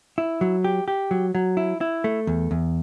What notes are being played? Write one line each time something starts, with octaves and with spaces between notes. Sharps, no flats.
E4
F#3
G4
G4
F#3
F#3
E4
E4
A3
E2
E2